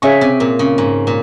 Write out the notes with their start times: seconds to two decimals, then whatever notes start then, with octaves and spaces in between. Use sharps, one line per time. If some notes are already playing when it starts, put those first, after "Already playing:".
0.02 C#3 G#4 C#5 E5 G#5 C#6
0.21 C3
0.40 A#2
0.59 C#3
0.78 G#2
1.07 A#2